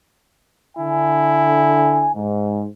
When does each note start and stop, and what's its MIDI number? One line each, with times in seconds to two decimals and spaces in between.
0.78 2.09 50
0.78 2.14 64
0.78 2.09 80
2.14 2.65 44